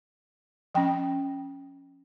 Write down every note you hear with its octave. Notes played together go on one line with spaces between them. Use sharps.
F3 C#4 G5